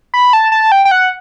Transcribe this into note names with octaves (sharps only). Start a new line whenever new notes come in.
B5
A5
A5
G5
G5
F#5